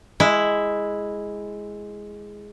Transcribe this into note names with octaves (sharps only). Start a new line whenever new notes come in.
G#3 E4